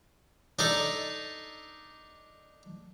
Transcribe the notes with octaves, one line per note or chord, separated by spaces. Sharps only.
D4 D#4 A4